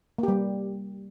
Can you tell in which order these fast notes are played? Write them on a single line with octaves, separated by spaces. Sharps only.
A#3 G4 G3